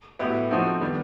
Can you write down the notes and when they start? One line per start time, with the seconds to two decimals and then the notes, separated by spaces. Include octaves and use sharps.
0.19 A2 F#3 B3 E4 G4
0.51 F3 A3 C4 D#4 F#4
0.81 D#3 G3 B3 D4